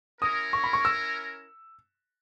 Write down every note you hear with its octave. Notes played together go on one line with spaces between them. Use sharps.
C#4 E4 A#4 D#6
C#6
B5
C#6
E6